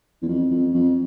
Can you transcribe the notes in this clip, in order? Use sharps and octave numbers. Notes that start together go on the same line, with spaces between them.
E2
F2
F2
F2